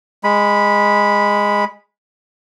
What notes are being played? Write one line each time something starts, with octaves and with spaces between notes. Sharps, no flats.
G#3 B5